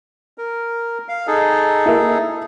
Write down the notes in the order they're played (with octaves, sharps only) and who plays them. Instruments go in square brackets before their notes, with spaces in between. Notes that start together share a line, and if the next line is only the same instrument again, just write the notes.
[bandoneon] A#4
F5
D#4 G#4 A4
[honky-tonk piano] A#3 E4